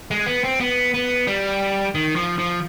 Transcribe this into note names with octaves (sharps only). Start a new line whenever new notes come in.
G#3
B3
C4
B3
B3
G3
D#3
F3
F3